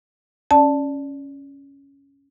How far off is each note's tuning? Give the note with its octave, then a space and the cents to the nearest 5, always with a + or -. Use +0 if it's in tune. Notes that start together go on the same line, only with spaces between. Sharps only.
C#4 +0 D5 +0 A5 +0